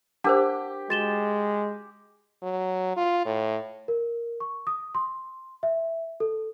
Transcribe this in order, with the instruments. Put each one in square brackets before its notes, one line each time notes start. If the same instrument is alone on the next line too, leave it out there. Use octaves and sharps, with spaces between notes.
[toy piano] D4 A#4 C5 [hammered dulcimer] G4 [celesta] F#5 A5 D6
[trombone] G#3 [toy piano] F#4 [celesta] A6 E7 G7
[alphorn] F#3
F4
A2
[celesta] A#4
C#6
D#6
C6
E5
A4